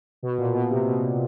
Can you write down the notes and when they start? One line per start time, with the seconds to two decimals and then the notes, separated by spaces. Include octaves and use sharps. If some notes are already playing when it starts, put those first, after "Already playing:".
0.23 B2
0.38 A#2
0.54 B2
0.70 C3
0.86 B2